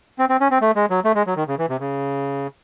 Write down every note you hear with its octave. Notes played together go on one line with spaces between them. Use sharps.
C4
C4
C#4
C4
A3
G#3
F#3
A3
G#3
F#3
D#3
C#3
E3
C3
C#3